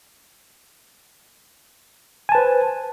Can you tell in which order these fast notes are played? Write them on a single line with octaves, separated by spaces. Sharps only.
G#5 A5 B4 C5